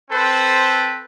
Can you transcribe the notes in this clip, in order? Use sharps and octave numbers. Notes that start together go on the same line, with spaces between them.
C4 A4 B4 C5